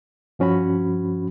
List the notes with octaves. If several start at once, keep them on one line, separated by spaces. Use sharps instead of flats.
G2 F3 C#4 F#4 B5